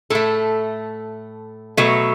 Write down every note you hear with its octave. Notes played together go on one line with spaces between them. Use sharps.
A2 A3 A4
B2 F#3 A3